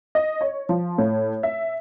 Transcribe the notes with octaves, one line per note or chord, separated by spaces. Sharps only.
D#5
C#5
F3
A2
E5